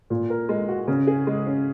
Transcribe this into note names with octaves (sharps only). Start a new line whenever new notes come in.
A#2
A#4
G#3
F#4
C#3
G#4
G#3
C#4